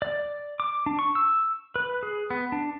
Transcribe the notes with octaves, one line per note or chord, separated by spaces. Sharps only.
D5
D6
D4
C#6
E6
B4
G#4
B3
D4